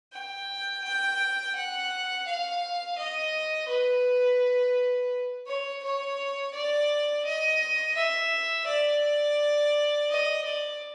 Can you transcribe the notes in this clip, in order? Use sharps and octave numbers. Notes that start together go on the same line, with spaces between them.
G5
G5
F#5
F5
D#5
B4
C#5
C#5
D5
D#5
E5
D5
D#5
D5